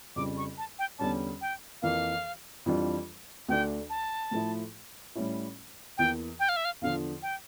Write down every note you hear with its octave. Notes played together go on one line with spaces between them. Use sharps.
F2 C#3 G3 D6
C#6
A5
G5
E2 D3 G3 C#4 A5
G5
F2 E3 A#3 F5
F2 E3 G3 D4 F4
D2 D3 A3 D4 G5
A5
A2 F3 A3 E4
A2 G3 C#4 E4
E2 E3 A#3 G5
G5
F5
E5
F5
E2 D3 F3 F5
G5